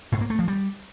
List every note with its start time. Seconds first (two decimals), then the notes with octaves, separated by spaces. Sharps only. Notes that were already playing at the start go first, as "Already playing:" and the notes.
0.12 G#2
0.21 A#3
0.30 A3
0.39 F3
0.48 G3